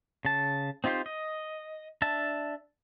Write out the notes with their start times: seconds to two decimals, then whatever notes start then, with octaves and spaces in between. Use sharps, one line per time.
0.25 C#3 A5
0.84 C4 D#4 F4 G4 C5
1.06 D#5
2.02 D4 E5 A5